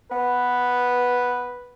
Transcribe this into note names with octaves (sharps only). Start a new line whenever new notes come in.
B3 B4